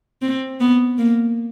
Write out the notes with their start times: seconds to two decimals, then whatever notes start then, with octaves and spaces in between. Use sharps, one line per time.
0.22 C4
0.60 B3
0.98 A#3